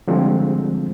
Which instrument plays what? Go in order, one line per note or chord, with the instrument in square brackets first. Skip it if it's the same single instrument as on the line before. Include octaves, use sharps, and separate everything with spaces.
[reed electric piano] D3 F3 G3 G#3 C4